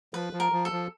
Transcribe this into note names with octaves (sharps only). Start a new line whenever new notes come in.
F3 B4
F3
A#4
F3
A4
F3